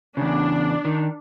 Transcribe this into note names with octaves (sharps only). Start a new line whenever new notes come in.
E2 C#3 D4
D#3